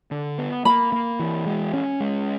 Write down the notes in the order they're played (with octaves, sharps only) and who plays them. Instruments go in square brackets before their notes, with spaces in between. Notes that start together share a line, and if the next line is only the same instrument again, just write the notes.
[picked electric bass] D3
B3
[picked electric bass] A#3 [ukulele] B5
[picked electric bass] A#3
E3
G#3
C#4
G#3